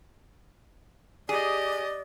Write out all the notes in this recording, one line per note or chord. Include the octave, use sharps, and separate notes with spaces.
G4 G#4 D5 D#5